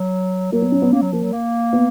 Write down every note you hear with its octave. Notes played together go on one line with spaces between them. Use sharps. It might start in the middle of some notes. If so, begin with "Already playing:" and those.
Already playing: F#3
F#3 A#3
B3
C#4
B3
A#3 C#4
F#3
F3 A#3
F#3
A#3
B3